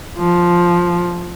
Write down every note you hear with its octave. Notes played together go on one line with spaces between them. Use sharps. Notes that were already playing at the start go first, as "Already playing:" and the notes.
F3